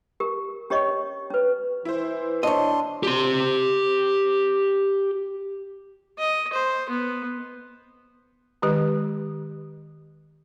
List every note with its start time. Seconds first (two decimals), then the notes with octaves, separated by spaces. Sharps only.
0.20 G4 A#4
0.70 C#4 G4 C#5 D#5 C#6
1.30 C#4 B4
1.85 E3 E4 C5
2.43 D4 C#5 D#5 C6
3.03 G4 C6
6.19 D#5
6.53 C5
6.89 B3
8.62 D#3 G#3 G4 B4